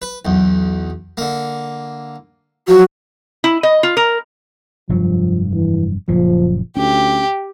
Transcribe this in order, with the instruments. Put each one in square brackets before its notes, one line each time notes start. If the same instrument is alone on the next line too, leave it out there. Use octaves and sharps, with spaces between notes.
[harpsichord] B4
B1 E2
D3 A#3
[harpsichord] F3 F#3 [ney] F#4
[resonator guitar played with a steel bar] E4
D#5
F4
A#4
[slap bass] F1 G2 F#3 [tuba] F3
[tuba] E3
[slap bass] F#1 A#2 C#3 [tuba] F3
[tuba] D2 [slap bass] C#4 [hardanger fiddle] G4